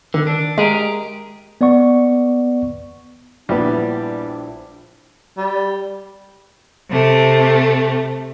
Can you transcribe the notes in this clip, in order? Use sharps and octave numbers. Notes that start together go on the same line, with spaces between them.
D3 D#3
D4
G#3 G4 G#4 A#4
B3 D5 F#5 C#6
A#1 G3 B3 D4 E4
G3
C3 A3